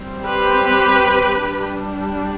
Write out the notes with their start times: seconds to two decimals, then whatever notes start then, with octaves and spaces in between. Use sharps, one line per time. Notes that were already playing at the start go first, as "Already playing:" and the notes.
Already playing: G3 C4
0.26 G4 B4
1.44 G3 D4